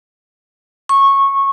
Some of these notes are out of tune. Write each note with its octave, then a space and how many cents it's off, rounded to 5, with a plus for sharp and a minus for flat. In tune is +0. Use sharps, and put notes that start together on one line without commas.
C#6 -15